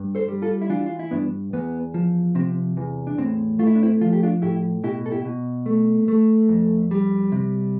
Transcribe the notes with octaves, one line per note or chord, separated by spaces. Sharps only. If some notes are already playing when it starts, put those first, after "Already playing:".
Already playing: G2
A4 C5
G3
F4 A4
E4
E3 D4 F4
F4
E4
G2 B3 D4
E2 B3
F3
C3 C4
E2
D4
A2 C4
A3 F4
E4
D4
C4 E4
F3 F4
G4
D4 F4
A2 E4 G4
B2 E4 G4
A4
E4 G4
B2
A3
A3
F2
G3
C3